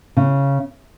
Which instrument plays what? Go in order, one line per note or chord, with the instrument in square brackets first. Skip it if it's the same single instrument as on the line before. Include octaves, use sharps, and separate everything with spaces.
[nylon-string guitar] C#3